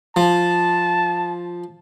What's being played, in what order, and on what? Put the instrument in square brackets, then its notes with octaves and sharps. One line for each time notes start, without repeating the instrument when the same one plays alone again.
[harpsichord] F3 [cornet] A5